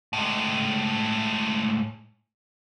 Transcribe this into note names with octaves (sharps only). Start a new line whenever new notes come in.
A2 G#3